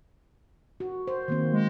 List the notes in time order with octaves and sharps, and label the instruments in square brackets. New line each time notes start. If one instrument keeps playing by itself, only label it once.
[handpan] F#4
C5
D#3 A#3 C4
[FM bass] G#3